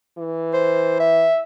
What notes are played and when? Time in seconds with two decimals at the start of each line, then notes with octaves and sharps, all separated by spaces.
0.18 E3
0.54 C5
1.00 E5